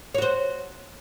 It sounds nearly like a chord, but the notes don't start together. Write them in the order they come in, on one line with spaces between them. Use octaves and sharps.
C#5 F#4 C5